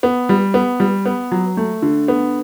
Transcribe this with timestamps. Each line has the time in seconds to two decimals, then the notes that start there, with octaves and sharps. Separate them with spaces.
0.03 B3
0.29 G3
0.54 B3
0.80 G3
1.06 B3
1.31 F#3
1.57 A3
1.82 D3
2.08 B3